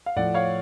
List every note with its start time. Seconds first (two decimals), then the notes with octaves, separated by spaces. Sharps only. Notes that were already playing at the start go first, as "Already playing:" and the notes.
0.06 F5
0.16 A2 F3 D5 F#5
0.34 C#5 F5